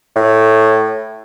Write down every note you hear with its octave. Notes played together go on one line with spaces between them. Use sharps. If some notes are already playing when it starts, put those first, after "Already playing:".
A2